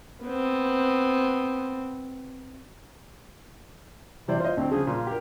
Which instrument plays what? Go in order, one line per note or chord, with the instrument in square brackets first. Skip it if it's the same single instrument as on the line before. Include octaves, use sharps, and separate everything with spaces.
[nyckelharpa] B3 C4
[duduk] C3 [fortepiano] E3 C5 D5
[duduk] F4 [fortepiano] C5 D#5
[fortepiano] D2 [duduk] C4
[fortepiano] C#3 F3 [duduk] G#4
[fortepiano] A#2 [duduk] F4
[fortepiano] G4 A#4